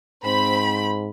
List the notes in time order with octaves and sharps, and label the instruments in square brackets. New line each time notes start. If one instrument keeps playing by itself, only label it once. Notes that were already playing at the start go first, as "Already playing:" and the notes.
[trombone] G#2 [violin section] C4 B5